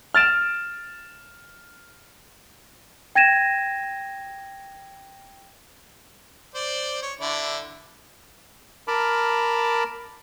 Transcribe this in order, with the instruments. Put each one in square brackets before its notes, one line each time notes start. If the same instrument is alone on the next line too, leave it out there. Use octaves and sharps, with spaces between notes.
[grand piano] F6 A6 D7 E7
[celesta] G5 G#6 A#6 D#7 E7
[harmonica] C5 D5
C#5
D3 E4 D5
[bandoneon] A#4 A5 B5 D6 F6